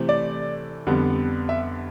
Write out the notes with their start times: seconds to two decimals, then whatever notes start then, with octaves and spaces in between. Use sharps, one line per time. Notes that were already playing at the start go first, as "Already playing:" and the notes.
Already playing: C3 E3 A3 C4
0.09 D5
0.87 F2 D3 G3 B3
1.49 E5